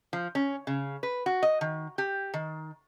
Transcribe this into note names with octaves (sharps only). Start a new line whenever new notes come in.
F3
C#4
C#3
B4
F#4
D#5
D#3
G4
D#3